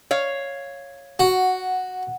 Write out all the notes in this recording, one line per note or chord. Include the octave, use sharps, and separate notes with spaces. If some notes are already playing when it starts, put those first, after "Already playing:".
C#5 F5
F#4 F#5